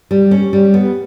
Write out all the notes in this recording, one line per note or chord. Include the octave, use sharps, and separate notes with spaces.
G3
C#4
G3
B3